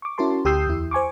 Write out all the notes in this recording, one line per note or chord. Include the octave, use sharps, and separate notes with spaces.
C#6 D6
C#4 E4 F#4 A#4 A5 C6
D2 G4 D#6 E6 G6 C7
E2 E4
C5 G#5 C#6 D6